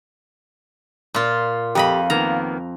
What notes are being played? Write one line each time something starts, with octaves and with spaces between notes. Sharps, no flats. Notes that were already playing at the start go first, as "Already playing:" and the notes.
A#2 F4
F2 G4 D#5 F5 B5
D#3 A#3 B3 A#5